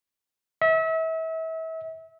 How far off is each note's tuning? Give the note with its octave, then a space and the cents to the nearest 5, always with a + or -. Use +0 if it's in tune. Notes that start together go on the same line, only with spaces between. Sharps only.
E5 -35